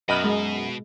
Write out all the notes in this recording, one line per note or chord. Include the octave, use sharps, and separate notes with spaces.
F#2 B2 A#4 D#5 B5
G#3